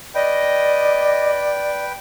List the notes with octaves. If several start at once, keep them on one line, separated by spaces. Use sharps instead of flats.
B4 D5 D#5 G5